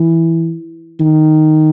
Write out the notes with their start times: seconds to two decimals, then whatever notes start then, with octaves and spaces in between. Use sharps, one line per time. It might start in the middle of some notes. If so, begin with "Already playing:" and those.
Already playing: E3
1.00 D#3